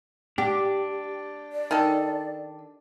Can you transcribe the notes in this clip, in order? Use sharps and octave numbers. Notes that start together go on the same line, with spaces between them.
D4 G4
D5
D#3 A4